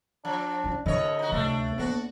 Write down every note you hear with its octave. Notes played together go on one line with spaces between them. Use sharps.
F3 D4
C#4 E4
C2 A2 D3 D4 E4 C#5 D#5
D#4 F#4
D2 C3 A3 D4
D2 A#3 B3 D4 F#4